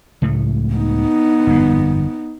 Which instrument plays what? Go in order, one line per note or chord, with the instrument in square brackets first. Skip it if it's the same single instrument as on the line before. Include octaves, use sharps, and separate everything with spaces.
[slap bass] C#2 A2 A3
[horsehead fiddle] B3 D#4
[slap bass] G1 F2 G#2